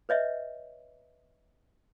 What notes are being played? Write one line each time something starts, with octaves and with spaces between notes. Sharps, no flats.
B4 C#5 D#5 E5